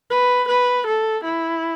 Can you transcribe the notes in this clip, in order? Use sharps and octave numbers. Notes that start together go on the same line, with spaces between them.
B4
B4
A4
E4